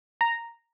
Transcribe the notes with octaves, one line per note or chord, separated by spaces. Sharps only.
A#5